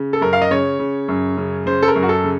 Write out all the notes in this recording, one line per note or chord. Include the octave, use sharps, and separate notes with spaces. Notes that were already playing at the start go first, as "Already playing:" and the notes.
Already playing: C#3
A4
F#2 A#4
F5
D#5
C#3 C#5
C#3
F#2
C#3
C#3 C5
A4
A#4
F#2
F#4
A4
C#3